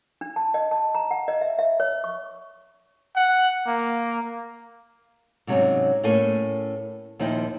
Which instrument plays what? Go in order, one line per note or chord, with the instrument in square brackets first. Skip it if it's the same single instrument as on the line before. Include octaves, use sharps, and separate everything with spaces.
[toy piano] D4
A5
D#5
A5
A#5
F#5
D#5
E5
E5
C#5
C#6
[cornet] F#5
A#3
[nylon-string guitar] G#2 C3 F#3 G#3 C#4 D#4
A2 A3 A#3 C#4 G#5
D#2 A#2 F3 D#4 E4 G5